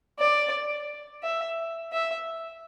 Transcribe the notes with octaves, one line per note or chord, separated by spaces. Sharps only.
D5
E5
E5